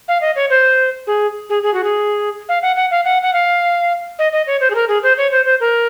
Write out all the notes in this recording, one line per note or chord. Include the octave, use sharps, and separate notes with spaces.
F5
D#5
C#5
C5
G#4
G#4
G#4
F#4
G#4
F5
F#5
F#5
F5
F#5
F#5
F5
D#5
D#5
C#5
C5
G#4
A#4
G#4
C5
C#5
C5
C5
A#4